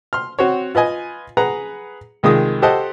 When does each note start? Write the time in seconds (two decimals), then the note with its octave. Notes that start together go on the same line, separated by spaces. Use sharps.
0.13 C6 F6
0.39 C4 F#4 C5 C#5
0.75 F4 B4 D#5 G#5
1.37 G#4 B4 F#5 A#5
2.23 C2 D#3 G#3 F4 G#4 D#6
2.62 G4 A4 C5 D#5 F#5 A5